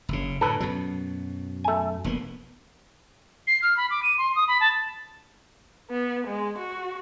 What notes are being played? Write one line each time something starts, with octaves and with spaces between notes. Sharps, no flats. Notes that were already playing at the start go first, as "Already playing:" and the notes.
F#1 C#3
A2 D3 A4 B4
F#2 B2 F#3
A3 G#5
F1 A#3 B3
C7
F6
B5
D6
D#7
C6
D#6
B5
A5
B3
G#3
F#4